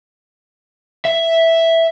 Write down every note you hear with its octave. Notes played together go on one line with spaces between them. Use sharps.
E5